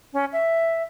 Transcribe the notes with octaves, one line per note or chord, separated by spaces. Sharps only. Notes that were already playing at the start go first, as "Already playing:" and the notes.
C#4
E5